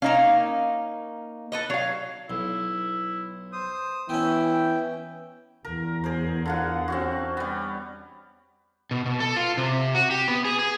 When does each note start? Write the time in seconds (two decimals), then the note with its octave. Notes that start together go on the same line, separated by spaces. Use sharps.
0.02 A#3 C#4 D#4 F5
1.52 A4 B4 D#5
1.70 F#3 C#5 F5
2.30 B1 E4
3.53 C5 D#6
4.09 E3 B3 C#4 E4 G5
5.65 E2 A#4
6.04 G#4 A#4 C5
6.46 D3 F4 F#5
6.88 C4 C#4 F#4
7.37 G3 B3
8.91 B2
9.06 B2
9.20 A4
9.37 F4
9.57 C3
9.95 F#4
10.11 G4
10.28 B3
10.45 G#4
10.59 G#4